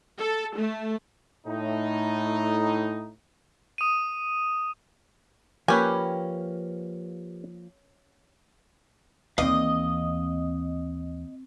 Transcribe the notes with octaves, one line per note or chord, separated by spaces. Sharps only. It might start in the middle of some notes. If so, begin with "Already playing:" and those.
A4
A3
A2 D#4
D#6 D#7
F3 A#3 C#4 G4 B4 G#5
D#2 E3 C4 D5 D#5 F5